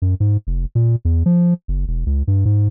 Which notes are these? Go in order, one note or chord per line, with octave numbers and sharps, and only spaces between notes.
F#2
G#2
F1
A#2
E2
F3
F#1
E1
C#2
G2
G#2